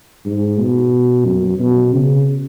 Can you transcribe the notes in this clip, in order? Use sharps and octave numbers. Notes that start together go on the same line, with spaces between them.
G#2
B2
F#2
B2
C#3